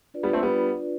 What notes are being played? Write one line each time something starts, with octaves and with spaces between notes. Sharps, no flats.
D4 F4 B4 D5
G3 B3
A3 C4
G3 B3